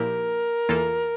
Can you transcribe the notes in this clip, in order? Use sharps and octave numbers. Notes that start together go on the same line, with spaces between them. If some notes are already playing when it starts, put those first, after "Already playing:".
Already playing: A#2 F3 A#3 E4 G4 A#4
E2 E3 A#3 F4 A4